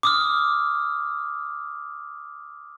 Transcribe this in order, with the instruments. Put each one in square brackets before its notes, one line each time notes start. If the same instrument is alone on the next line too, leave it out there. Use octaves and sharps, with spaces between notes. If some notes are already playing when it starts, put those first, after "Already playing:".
[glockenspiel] D6 D#6 F6